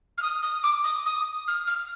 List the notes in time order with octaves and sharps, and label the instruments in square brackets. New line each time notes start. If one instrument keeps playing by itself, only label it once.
[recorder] F6
D#6
D#6
D6
D#6
D#6
F6
F6